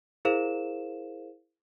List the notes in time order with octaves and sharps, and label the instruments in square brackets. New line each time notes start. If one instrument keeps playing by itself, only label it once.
[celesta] E4 G#4 A#4 C5 F5 E7